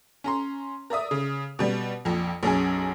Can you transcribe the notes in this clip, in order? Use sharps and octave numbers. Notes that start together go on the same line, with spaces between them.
C#4 A#5 C6
A#4 D5 E5 D#6
C#3
B2 G3
A#1 F2
B1 F#2 C#4 G#4